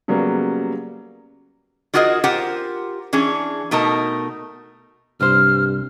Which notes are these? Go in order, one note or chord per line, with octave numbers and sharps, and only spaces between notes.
C#3 F#3 G3 A#3 B3
G3 F4 F#4 G#4 A#4 D#5
F4 G4 A#4 C5 F#5
E3 C#4 D4 G#4
B2 A3 D#4 A#4 A5
C2 G2 C5 F6